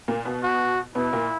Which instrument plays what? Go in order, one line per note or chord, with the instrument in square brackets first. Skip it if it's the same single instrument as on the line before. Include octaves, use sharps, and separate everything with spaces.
[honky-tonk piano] A#2 A#3
B2 B3
[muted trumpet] F#4
[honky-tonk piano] B2 B3 [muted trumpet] E4
[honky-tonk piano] A#2 A#3